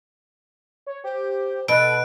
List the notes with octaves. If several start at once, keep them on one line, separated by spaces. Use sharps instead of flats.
C#5
G4 C5
B2 A4 B5 F#6 D7